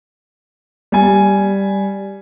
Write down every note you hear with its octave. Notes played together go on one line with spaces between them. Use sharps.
G3 G#5